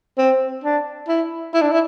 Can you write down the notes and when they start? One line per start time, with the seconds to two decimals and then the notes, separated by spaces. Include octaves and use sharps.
0.18 C4
0.64 D4
1.08 E4
1.54 E4
1.62 D4
1.71 E4